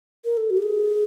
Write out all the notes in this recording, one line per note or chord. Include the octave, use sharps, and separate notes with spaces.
A#4
A4
F#4
G4
G#4